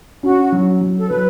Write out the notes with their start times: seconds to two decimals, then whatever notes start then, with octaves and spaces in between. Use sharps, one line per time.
0.23 C#4 F#4
0.52 F#3
0.81 F#3
0.98 A4
1.10 F#3 B4